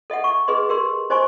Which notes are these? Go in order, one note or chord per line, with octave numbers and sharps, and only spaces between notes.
A4 D#5 E5 F#5
C#6
G#4 B4 D#5 C6
G4 A#4 C6
D#4 C5 D#5 G#5 C6 C#6